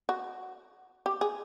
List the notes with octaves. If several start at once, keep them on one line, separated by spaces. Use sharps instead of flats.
F#4
G4
G#4